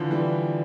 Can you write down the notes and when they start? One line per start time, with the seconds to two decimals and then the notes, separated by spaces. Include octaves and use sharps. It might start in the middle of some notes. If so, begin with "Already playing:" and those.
Already playing: D3 E3 F3
0.11 E3 G3